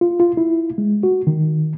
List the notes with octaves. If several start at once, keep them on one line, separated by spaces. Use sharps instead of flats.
F4
F4
E4
G#3
F#4
D#3